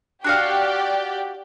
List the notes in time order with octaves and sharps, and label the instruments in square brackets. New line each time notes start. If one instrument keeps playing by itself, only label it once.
[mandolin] D4 F#4 F5 [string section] G4 D5